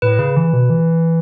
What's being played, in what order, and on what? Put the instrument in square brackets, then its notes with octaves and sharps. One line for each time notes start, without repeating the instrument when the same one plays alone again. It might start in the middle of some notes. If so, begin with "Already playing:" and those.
[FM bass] A2 [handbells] B4
[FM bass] C#3
E3
B2
E3